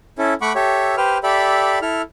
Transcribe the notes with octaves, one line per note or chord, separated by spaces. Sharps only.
C#4 E4 A4
A3 F#5 B5 C#6 D6
G4 A4 C#5 E5
G4 B4 C5 G5 F6
G4 A4 D5 E5 B5
E4 A4 F6